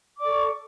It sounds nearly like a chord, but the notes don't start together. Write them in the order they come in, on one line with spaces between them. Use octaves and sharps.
D6 D5 A4 C#6